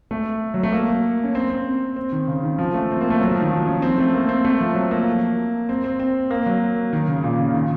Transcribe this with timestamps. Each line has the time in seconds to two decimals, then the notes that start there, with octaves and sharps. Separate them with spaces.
0.11 A3
0.54 F#3
0.63 A3
0.72 A#3
1.24 C#4
1.35 C4
1.50 C4
1.96 C4
2.12 D#3
2.27 C#3
2.43 D#3
2.59 F3
2.74 A3
2.91 C4
3.01 A#3
3.10 A3
3.20 F#3
3.31 F3
3.41 D#3
3.51 F3
3.66 C#4
3.82 C4
3.98 A3
4.14 A#3
4.29 C4
4.45 A3
4.60 F3
4.75 F#3
4.91 A#3
5.69 C4
5.84 C4
6.00 C4
6.30 A#3
6.46 F#3
6.93 D#3
7.08 C#3
7.23 A#2
7.39 C#3
7.54 D#3